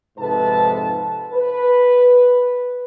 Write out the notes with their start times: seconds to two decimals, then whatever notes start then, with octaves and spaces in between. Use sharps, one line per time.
0.18 F2 G#2 C3 A4 B4 A5
1.33 B4